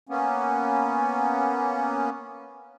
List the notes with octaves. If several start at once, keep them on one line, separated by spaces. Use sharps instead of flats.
A#3 B3 C#4